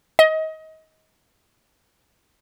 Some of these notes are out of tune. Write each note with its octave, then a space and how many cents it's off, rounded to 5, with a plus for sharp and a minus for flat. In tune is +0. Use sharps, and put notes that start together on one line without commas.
D#5 +25